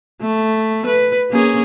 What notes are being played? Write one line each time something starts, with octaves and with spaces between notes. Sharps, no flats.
A3
B4
A#3 C#4 G#4